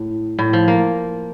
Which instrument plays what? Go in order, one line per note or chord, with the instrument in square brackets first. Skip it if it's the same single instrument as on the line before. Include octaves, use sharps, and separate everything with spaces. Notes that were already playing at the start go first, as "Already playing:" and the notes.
Already playing: [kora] A2
A2
F3
A#3